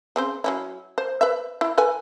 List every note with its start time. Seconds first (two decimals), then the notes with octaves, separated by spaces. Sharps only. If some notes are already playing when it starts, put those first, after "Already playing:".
0.16 C#3 C4 C5
0.44 F#3 C#4 E4
0.98 C5
1.21 B4 E5
1.61 E4
1.78 A4 B4 G#5